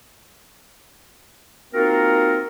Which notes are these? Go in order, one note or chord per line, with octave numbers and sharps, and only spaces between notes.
A#3 C4 D#4 F4 F#4 A#4